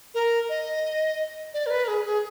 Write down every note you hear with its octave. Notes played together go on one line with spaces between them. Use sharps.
A#4
D#5
D5
A#4
B4
A#4
G#4
G#4